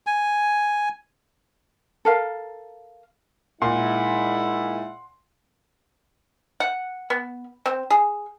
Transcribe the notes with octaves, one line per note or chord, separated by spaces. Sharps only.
G#5
A4 A#4 F5
A#2 G#3 D#4 E4 F#5 C6
F#5
B3
C4
G#4